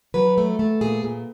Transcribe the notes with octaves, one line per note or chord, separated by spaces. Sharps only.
F#3 B4
A3
A3
A#2 G#4
A#2